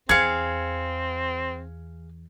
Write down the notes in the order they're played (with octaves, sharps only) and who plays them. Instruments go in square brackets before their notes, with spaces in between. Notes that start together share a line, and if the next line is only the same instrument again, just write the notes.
[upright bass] E2 [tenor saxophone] C4 [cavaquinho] G#4 F5 [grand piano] G#6 C#7